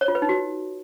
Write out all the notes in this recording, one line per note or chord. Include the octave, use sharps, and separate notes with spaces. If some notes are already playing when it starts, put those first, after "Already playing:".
C#5
F4
B4
D#4
F#4